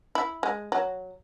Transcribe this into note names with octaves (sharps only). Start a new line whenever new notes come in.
E4
G#3
F#3